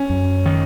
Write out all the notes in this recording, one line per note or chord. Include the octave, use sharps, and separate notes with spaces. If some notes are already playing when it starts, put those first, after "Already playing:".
Already playing: C#4
F#2
D#3